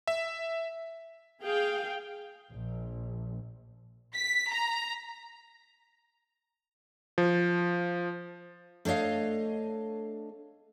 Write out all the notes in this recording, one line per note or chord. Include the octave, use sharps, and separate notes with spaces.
E5
G#4 F5 G5
A#1
B6
A#5
F3
A3 D4 C#5 D#5 F5